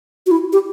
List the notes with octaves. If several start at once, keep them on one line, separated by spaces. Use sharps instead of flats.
F#4
E4
G4